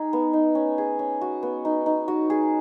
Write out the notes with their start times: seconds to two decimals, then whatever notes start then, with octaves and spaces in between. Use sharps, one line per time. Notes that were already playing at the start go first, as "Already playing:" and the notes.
Already playing: D#4 G#4
0.13 B3
0.33 D#4
0.55 C#4
0.78 G#4
0.99 C#4
1.21 F#4
1.43 B3
1.65 D#4
1.86 D#4
2.08 F#4
2.30 G#4